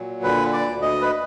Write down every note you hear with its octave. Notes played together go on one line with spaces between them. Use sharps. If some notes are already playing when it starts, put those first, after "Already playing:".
Already playing: A#2 F#3
D3 B4
D5
D2
D#5
B4